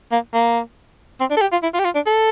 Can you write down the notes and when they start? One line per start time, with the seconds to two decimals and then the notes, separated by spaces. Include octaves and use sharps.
0.12 A#3
0.33 A#3
1.20 C4
1.30 D4
1.37 A4
1.41 G4
1.52 F4
1.63 E4
1.74 F4
1.79 G4
1.84 F4
1.95 D4
2.06 A4